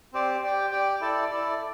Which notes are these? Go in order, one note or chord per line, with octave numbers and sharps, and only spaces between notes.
C4 G4 D5
G4 D5 G5
G4 D5 G5
E4 A4 D5
E4 A4 D5